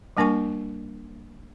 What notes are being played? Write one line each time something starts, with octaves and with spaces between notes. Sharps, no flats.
G3 A#3 D4 A#4 G#5 C#6